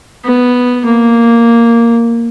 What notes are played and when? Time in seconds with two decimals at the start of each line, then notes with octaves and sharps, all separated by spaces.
0.24 B3
0.85 A#3